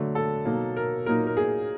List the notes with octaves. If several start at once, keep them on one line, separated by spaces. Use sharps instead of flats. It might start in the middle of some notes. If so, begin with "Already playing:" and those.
Already playing: D3 F#3 A3
A4
B2 F#3 A#3 D#4
A#4
A#2 F#3 A#3 D#4 A#4
A#4
G#4